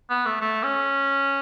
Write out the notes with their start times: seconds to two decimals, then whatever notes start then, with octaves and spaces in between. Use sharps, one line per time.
0.10 B3
0.26 A3
0.41 A3
0.64 C#4